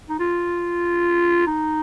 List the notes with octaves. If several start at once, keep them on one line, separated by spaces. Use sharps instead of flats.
D#4
F4
D#4